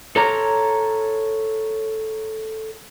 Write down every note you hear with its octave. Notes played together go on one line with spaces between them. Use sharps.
A4 C#5 A#5